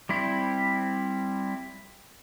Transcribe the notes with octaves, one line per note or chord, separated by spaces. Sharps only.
G3 C4 E4